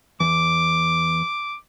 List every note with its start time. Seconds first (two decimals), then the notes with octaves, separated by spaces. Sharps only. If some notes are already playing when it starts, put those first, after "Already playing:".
0.20 E2 D6